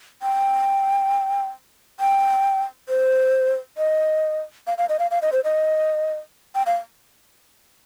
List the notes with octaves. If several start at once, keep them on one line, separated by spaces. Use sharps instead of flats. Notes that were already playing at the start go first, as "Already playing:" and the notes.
G5
G5
C5
D#5
F5
F5
D#5
F5
F5
D#5
C5
D#5
G5
F5